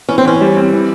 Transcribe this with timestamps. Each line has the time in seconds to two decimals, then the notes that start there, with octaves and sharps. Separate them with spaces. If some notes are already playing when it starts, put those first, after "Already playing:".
0.09 E3 C#4
0.18 C4
0.25 E3 C#4
0.41 G3
0.57 C4
0.73 E3